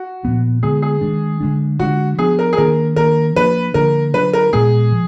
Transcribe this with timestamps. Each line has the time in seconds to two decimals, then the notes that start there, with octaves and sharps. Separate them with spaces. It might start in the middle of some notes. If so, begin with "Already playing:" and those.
Already playing: F#4
0.23 A#2 F3 B3 D4
0.63 D3 G#3 B3 G#4
0.82 G#4
1.01 D#3 G#3 D4
1.40 D3 G#3 D4
1.79 D3 G#3 D4 F#4
2.18 F3 B3 D4 G#4
2.39 A#4
2.53 G#4
2.58 D#3 A#3 D4 A#4
2.96 D#3 A#3 D4 A#4
3.36 F3 A#3 D4 B4
3.74 D3 F3 A#3 D4 A#4
4.14 D3 F#3 D4 B4
4.33 A#4
4.53 A#2 G#3 B3 G#4
4.92 F3